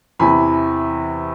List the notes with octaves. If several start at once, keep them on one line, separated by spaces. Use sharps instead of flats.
E2 C3 E3 G#5 B5